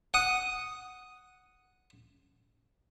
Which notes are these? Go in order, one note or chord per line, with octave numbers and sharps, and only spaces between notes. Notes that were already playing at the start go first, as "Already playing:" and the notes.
F#5 D#6